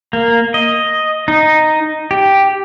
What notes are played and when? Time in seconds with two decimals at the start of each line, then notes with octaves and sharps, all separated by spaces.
0.13 A#3
0.54 D#5
1.28 D#4
2.11 G4